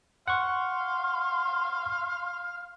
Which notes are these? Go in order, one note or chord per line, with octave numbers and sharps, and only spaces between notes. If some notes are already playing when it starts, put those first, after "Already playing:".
F5 F#5 C6 C#6